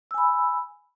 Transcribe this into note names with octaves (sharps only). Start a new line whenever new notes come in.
G#5 B5 E6